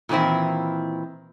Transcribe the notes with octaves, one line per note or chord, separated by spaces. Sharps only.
A#2 D#3 E3 C4 E4